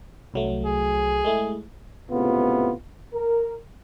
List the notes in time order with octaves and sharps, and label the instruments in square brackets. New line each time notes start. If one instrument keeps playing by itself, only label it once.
[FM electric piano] C2 F#3 A3
[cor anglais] G#4
[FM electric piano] G#3 A3 E4
[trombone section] C#2 A2 C3 B3 F4
A#4